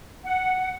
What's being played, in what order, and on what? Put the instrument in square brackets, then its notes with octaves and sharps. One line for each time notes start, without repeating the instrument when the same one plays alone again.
[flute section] F#5